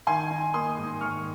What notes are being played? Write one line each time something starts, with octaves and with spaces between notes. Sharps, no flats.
D#3 G#5 C6
D#4
A#3 C6 D#6
G#2
D#3 C#6 F6